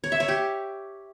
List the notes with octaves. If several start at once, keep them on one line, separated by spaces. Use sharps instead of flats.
C#5
E5
C#5
G4